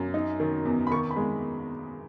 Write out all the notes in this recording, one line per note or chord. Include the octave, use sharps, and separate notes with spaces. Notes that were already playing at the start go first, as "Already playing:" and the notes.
Already playing: F#2
D#4
D#3
E2
B5
D#3 C#6
B5
G#3